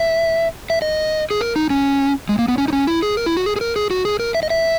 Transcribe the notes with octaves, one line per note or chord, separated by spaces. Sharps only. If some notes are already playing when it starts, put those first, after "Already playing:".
Already playing: E5
E5
D#5
G#4
A#4
D#4
C#4
G#3
A#3
B3
C#4
D#4
C#4
E4
G#4
A#4
E4
F#4
G#4
G#4
A#4
G#4
F#4
G#4
A#4
E5
D#5
E5